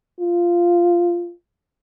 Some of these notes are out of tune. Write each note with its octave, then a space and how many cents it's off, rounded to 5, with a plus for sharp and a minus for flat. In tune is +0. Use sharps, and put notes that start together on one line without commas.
F4 -10